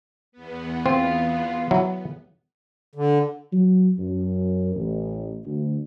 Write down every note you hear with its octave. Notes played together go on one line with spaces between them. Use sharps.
E2 B3
C4 F4
F#3 E4
D3
F#3
F#2
A1
D2